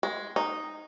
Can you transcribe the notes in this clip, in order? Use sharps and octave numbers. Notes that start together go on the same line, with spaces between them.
G#3
D#4